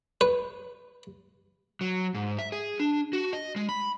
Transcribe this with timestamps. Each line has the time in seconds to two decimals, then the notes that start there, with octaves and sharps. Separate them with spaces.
0.21 B4
1.81 F#3
2.15 G#2
2.39 E5
2.52 G#4
2.79 D4
3.13 F#4
3.33 D#5
3.56 G#3
3.69 B5